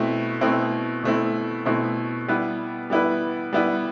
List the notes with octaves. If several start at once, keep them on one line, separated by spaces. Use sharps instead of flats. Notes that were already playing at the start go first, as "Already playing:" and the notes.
Already playing: B2 A3 C4 E4
B2 A3 C4 E4
B2 A3 C4 E4
B2 A3 C4 E4
G3 B3 E4 B4
G3 B3 E4 B4
G3 B3 E4 B4